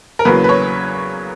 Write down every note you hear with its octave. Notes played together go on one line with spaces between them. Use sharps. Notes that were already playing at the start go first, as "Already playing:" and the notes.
A#4
E2 C#3 F#3 A#3 B4
B4
C#5